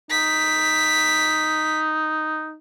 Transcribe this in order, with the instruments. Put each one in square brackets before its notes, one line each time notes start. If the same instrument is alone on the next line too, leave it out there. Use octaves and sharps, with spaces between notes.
[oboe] D#4 [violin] B6